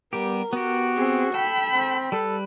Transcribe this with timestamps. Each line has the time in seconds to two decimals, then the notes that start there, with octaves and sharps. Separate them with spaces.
0.13 G3 B3 G4 A#4
0.53 B3 F#4 G4
0.96 C4 G#4
1.34 A4 G5 B5
1.73 C4
2.12 G3 A4 B4